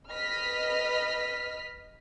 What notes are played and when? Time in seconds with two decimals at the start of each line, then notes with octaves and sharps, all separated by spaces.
0.11 B4 D#5 F6 B6